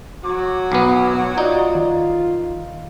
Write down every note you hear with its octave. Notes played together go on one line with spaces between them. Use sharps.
F#3 F#4 D6
B1 B3 D6
D#4 F4 D5
D#3